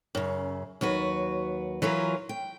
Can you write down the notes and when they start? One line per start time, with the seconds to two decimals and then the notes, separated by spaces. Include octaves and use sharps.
0.15 F#2 C#3
0.81 D#2 F#3 F#4 B4
1.82 E3 F#3 F4 A#4 B4
2.29 G5